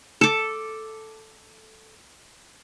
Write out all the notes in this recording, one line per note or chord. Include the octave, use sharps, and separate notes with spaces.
A4 D6